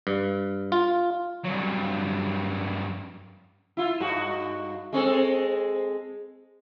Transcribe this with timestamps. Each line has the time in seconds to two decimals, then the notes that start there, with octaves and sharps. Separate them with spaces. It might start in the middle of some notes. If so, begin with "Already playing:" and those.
0.07 G2
0.72 F4
1.45 G2 F#3
3.77 E4 F4
4.00 G2 D#4 F#4
4.93 G#3 C4 A4